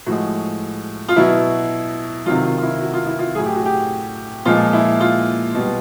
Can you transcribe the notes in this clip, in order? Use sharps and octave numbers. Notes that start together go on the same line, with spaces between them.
A2 F3 G#3 F#4
F4
B2 F#3 E4
C3 D#3 F#3 F4
F4
F4
E4
F#4
F4
E4
F4
A2 F#3 G#4
G4
F#4
G4
A#2 F3 G#3 F4
E4
F4
B2
G3